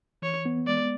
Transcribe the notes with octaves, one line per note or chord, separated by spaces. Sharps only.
E3 C#5
B3
G#3 D5